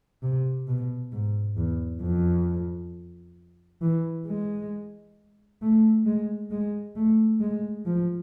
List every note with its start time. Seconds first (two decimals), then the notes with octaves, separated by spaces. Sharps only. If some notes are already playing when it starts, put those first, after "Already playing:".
0.23 C3
0.67 B2
1.12 G#2
1.57 E2
2.02 F2
3.81 E3
4.26 G#3
5.62 A3
6.06 G#3
6.51 G#3
6.96 A3
7.40 G#3
7.86 F3